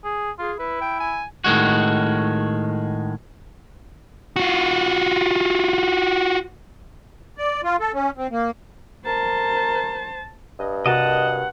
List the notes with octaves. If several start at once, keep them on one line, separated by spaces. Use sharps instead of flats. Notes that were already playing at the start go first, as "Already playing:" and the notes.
G#4
F4 G#4
E4 B4
G5
G#5
A2 D#3 G#3 F#4
F4 F#4
D5
F4
A4
C#4
C4
A#3
A#4 C5 A5
G2 D#5
C3 F#4 A#4 D#5 F#5 A5